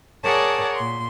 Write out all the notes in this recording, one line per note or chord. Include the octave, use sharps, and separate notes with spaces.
G#4 A#4 C#5 D5 F#5 A5
A#2 C6